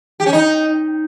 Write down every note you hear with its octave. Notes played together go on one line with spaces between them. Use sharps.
G4
C#4
D#4